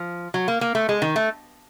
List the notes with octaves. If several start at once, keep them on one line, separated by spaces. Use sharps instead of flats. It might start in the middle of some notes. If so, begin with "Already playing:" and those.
Already playing: F3
F#3
A#3
A#3
A3
G#3
D#3
A3